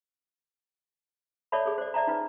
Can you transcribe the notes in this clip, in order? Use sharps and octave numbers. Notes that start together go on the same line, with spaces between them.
A4 C#5 D5 E5 A5 B5
G#4 A4
C5 D5
D5 E5 A5 A#5
D#4 F4 B4